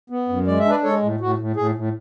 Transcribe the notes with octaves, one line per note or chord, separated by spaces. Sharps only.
B3
F#2
G#3 D5
E5
D4
B4 D5
G#3 A4 C#5
A2
A2 F#4
A2
A2 G#4
A2